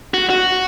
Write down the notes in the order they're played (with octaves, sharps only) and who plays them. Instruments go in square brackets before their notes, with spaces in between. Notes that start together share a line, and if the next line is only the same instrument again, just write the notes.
[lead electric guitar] F#4
F#4